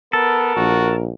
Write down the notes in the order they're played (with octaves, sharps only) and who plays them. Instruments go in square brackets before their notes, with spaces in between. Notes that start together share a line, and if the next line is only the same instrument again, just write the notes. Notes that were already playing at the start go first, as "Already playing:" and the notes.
[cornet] B3 [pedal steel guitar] A4 [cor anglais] A#4
[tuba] A#1 [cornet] F#4